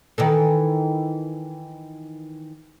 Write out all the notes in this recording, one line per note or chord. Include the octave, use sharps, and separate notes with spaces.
D#3 E3 A4